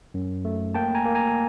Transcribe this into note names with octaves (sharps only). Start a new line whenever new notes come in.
F#2
A3
A#3 G5 A5
G#5 A#5
A#3
G#5 A#5